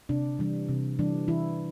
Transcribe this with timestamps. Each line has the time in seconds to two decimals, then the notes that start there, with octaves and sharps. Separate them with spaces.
0.09 C3 D4
0.39 E3 G3 D4
0.69 C3
0.99 E3 G3 D4
1.28 E3 E4